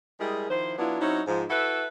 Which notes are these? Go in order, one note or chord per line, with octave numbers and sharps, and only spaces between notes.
G3 G#3 E4 G#4 A#4
D#3 F3 E4 C5
F#3 B3 D4 E4 F4
F#3 C4 C#4 D#4 E4
G#2 F3
E4 F#4 A4 B4 E5